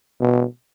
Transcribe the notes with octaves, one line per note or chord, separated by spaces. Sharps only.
B2